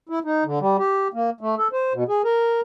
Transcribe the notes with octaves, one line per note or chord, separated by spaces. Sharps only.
E4
D#4
D3
G3
G4
A#3
A3
A4
C5
B2
G#4
A#4